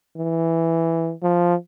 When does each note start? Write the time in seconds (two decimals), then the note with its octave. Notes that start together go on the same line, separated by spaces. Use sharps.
0.16 E3
1.23 F3